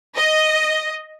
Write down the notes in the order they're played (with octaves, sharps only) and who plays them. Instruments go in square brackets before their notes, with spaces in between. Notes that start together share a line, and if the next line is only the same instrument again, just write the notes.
[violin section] D#5